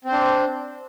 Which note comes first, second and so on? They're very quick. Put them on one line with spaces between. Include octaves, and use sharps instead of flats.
C4 C5 D4